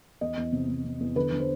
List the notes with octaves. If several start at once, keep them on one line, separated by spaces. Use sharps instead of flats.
E2 D#5
E2
C3
C3
C3
E2
D3 B4
D3
C5